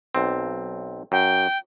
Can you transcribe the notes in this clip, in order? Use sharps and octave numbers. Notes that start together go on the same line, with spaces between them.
B1 C4
F#2 G5